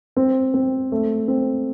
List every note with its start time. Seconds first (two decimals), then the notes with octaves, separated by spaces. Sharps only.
0.17 C4
0.54 C4
0.92 A3
1.28 C4